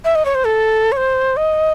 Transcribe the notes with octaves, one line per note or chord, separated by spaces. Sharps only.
E5
D#5
C#5
C5
A4
C#5
C5
D#5